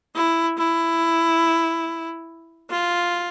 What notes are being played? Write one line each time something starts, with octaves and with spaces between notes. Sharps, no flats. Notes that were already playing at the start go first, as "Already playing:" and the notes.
E4
E4
F4